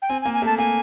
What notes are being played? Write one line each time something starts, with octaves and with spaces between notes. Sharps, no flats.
G5
C4 G#5
G#5
A#3
G#5
A3
A5
A#3 G#5